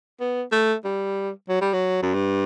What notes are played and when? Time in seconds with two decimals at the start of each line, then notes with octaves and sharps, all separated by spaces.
0.20 B3
0.52 A3
0.84 G3
1.49 F#3
1.61 G3
1.73 F#3
2.02 F#2
2.14 G2